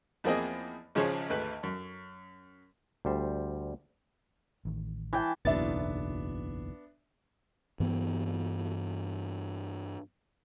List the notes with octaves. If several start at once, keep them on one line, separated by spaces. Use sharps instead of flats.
E2 F3 A#3 C4 G#4 D#5
G#1 C#3 F3 G#4 C5 C#5
G#1 D2 B4 B5
F#2
D2 G3 C5
A1 D#3
E3 G5 A5
F#1 B1 E2 B3 D4 E4 E5 A6
G2 E3 B3